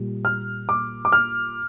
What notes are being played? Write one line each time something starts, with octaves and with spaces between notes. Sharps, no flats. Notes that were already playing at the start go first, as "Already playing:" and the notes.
Already playing: A#2 G3
F6
D6
D6
F6